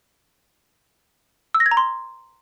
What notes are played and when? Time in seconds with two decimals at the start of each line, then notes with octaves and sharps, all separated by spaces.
1.54 E6
1.60 A#6
1.66 G#6
1.71 A#5
1.77 C6